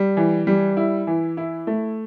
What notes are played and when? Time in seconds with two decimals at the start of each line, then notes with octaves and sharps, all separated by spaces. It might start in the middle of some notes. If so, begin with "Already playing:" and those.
Already playing: G3
0.17 E3
0.47 G3
0.77 E4
1.07 E3
1.37 E4
1.67 A3